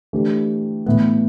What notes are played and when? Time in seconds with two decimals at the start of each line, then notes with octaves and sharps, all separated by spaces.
0.13 E3 A3 D4 G4
0.86 A2 E3 B3